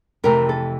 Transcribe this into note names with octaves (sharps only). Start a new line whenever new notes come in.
F2 C3 E3 A3 A#4
A4